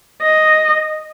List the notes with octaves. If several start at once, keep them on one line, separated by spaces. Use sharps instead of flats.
D#5